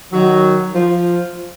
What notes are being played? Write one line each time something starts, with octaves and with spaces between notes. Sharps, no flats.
D#3 F#3
F3